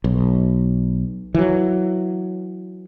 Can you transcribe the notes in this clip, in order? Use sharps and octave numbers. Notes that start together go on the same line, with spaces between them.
B1
E3 F#3